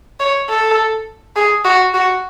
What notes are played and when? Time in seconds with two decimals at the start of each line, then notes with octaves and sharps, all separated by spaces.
0.20 C#5
0.49 A4
1.36 G#4
1.65 F#4
1.94 F#4